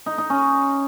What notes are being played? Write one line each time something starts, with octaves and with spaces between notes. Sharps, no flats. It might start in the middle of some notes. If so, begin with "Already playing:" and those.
D#4
D#4
C#4